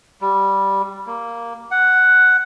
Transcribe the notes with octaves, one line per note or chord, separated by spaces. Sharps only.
G3
A#3
F#5